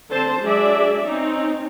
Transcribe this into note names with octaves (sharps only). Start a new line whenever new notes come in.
D3 C4 C5 A5
F#3 G#3 D4 G#4 D5 E5
C4 C#4 D#4